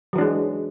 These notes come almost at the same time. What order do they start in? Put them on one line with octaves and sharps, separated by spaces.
F#3 E3 D4 G#3